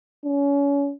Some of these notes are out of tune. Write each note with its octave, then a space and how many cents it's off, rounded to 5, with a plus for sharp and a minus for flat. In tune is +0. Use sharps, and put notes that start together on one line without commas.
C#4 +30